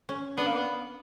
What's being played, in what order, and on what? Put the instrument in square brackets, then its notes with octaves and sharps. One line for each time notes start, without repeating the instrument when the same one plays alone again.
[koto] C#4
[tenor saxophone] B3 [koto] D4
[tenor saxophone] A#3
B3